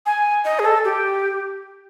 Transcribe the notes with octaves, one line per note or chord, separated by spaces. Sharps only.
G#5
D#5
G#4
A4
G4